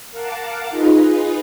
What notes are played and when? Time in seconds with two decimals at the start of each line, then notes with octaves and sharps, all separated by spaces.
0.11 A#4 F5 F#5 A5 D6
0.70 D#4 F4 G#4 B4 D#5